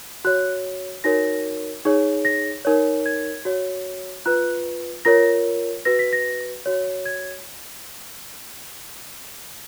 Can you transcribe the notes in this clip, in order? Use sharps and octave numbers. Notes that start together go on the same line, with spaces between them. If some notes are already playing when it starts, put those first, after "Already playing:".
F#4 C#5 F#6
D#4 F#4 A#4 C#5 A#6
D#4 G#4 C#5
A#6
D#4 A#4 C#5
G#6
F#4 C#5
F4 B4 F#6
F4 A#4 C#5 A#6
F#4 B4 A#6
B6
A#6
F#4 C#5
G#6